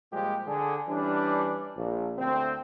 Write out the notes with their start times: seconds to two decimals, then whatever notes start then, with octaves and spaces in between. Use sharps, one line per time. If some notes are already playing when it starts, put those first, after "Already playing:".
0.12 A#2 F3 G3 G#3 G4
0.47 D3 G#4
0.88 E3 G3 C#4 D4
1.76 A#1
2.18 D2 C4